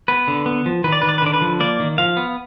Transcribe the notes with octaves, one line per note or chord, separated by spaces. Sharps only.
B3 B4
D3
B3
F3
D#3 B4
D5
D#3 B4
D5
B4
D3 D5
B4
F3
A#3 D5
D#3
F3 F5
B3